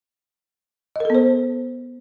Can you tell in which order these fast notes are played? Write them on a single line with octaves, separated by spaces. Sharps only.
D#5 A#4 A4 B3 C5